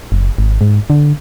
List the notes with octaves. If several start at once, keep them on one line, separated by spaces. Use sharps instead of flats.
F#1
G#1
G#2
D3